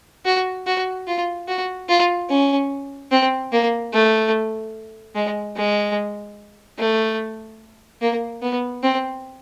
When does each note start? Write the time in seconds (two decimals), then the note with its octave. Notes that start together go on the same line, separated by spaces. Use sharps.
0.26 F#4
0.67 F#4
1.07 F4
1.48 F#4
1.89 F4
2.30 C#4
3.12 C4
3.52 A#3
3.93 A3
5.15 G#3
5.57 G#3
6.79 A3
8.01 A#3
8.42 B3
8.83 C4